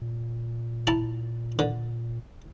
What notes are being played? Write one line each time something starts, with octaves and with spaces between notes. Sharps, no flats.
A#2
E4 A5 A#5
D3